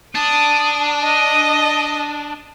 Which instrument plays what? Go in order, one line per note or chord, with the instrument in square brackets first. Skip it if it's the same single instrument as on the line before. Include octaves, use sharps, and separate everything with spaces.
[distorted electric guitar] D4 [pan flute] A5 [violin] D#6
[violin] D#5